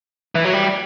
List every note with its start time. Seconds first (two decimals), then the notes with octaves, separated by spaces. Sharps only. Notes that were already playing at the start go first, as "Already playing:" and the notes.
0.35 E3
0.45 F#3
0.53 G3